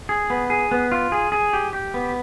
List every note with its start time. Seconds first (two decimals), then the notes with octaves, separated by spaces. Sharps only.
0.09 G#4
0.30 B3
0.50 G#4
0.72 B3
0.92 F4
1.12 G#4
1.32 G#4
1.53 G4
1.73 G4
1.94 B3